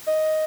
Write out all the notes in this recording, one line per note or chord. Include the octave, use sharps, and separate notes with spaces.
D#5